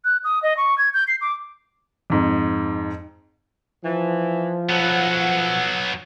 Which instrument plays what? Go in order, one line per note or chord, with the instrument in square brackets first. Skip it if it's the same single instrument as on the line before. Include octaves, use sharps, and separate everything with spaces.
[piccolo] F#6
D#6
D#5
C#6
G#6
G6
C7
D6
[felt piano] F2 G#2
[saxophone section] E3 [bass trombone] F3
[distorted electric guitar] F#3 B3 [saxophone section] A4 F#5